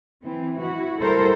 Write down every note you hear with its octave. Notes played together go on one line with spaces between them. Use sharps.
E3 C4
E4 F#4
G3 E4 A4 A#4 C5